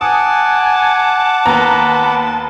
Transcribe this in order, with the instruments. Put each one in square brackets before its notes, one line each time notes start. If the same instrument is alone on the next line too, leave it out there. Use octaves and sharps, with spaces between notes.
[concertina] F#5 D6 [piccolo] G#5 [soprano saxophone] A5 [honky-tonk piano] D#6
[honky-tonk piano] D#2 B3 A#5 [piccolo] B5